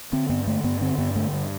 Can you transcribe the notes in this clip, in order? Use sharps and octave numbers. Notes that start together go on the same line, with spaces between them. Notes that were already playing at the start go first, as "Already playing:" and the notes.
D3 C4
G2 B3
D3 A3
G2 B3
D3 C4
G2 B3
D3 A3
G2